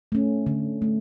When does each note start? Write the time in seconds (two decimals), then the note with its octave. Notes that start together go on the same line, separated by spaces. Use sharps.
0.12 A3 C#4
0.46 D3
0.82 A3